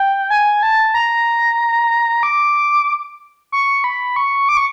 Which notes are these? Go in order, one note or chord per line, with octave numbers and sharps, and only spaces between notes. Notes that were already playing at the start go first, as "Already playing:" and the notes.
Already playing: G5
G#5
A5
A#5
D6
C#6
B5
C#6
D6
C#6